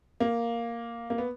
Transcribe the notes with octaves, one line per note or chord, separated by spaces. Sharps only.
A#3
A#3
B3